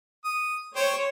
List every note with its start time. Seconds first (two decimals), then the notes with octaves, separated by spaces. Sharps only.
0.25 D#6
0.76 C5 C#5 G5